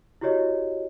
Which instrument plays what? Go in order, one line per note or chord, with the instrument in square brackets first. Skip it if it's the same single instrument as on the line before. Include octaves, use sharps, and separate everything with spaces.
[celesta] E4 F#4 G4 C#5 D#5